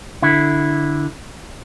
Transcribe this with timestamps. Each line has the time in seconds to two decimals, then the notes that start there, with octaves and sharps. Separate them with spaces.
0.22 D3 E4